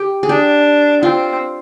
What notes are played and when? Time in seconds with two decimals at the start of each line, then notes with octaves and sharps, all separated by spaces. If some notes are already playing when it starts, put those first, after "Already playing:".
Already playing: G4
0.23 G#4
0.29 D4 G4
1.02 C4 F4